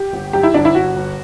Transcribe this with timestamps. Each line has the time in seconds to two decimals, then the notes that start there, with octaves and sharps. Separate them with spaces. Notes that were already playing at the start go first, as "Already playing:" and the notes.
Already playing: G4
0.13 G1
0.33 F#2 G4
0.43 E4
0.54 G1 D4
0.65 E4
0.75 G1 F#4
0.96 G1